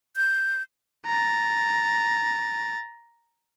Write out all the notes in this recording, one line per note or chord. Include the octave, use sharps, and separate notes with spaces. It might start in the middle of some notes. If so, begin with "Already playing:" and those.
G6
A#5 A6